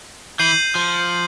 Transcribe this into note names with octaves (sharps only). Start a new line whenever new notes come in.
E3 G6 C7 D#7 F#7
F3